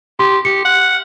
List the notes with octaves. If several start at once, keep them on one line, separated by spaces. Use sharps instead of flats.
G4 C6
G4 C#7
F#5